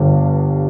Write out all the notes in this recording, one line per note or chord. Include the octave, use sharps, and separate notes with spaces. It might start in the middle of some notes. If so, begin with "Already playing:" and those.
Already playing: G1 G2